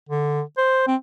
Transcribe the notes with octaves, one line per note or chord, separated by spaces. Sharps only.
D3
C5
C4